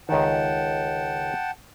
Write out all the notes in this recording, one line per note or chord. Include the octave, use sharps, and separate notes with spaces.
C#2 D#3 F#5 G5 A5